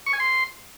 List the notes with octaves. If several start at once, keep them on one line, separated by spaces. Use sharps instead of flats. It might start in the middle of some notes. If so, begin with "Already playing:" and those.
C#6
G#5
C6